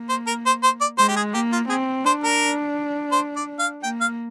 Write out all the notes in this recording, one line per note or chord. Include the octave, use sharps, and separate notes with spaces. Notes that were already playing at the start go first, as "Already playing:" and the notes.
Already playing: A#3
C5
A#4
C5
C5
D5
G#3 C5
G4
G#4
A#3 G4
F4
C4 G#4
D4 C5
A#4
C5
D5
F5
A#3 G5
F5